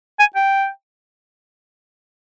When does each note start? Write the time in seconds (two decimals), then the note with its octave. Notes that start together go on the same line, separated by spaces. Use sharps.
0.19 G#5
0.35 G5